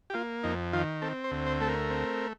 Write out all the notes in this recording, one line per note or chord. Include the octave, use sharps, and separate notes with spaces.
G4
A#3 F4
F2 D#4
D#3 F4
C4 A4
C5
D2
C5
A3 A4
A#4
C4